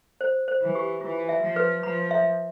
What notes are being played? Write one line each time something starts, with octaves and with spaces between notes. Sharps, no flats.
C5
C5
E3
G4
E3 F4
E5
F3
B4
F3 B5
E5